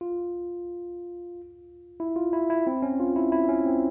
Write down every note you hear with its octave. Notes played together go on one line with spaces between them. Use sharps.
F4
E4
F4
E4
E4
C4
C#4
F4
E4
E4
C#4
C4